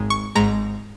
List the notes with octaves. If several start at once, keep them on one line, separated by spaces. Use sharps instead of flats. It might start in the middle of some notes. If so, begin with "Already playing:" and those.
Already playing: G#1 G#2 G#3
C#6
G#1 G#2 G#3 A#5